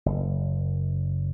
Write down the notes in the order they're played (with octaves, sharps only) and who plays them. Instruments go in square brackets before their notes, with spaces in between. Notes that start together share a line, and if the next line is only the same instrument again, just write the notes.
[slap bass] F#1